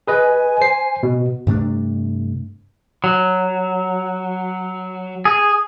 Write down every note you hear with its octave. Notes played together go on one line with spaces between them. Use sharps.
G#4 B4 D#5 G#5
C5 C7
B2
G2 C3 A3 D4
F#3
G#4